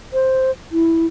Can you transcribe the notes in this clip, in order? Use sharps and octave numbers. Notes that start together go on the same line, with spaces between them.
C5
E4